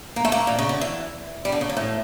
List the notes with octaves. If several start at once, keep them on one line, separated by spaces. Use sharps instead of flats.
A#3
A3
A#3
A#2
C#3
D3
E3
G3
D3
C#3
A#2
A2